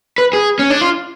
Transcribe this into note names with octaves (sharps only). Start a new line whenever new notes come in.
B4
G#4
C#4
D4
F4